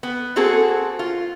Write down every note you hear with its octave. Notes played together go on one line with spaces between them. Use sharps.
B3
A#3 C4 F#4 G#4 A4
F4